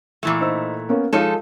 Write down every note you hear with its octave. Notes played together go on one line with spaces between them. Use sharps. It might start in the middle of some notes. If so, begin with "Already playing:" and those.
A#2 E3 A3
D#4 C5 E6
A#3 B3 C#4
F3 G#3 D#4 F4 A4 C#5